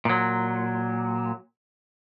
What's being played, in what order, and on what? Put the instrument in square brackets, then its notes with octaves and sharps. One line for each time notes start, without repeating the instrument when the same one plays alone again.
[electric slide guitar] A#2 F#3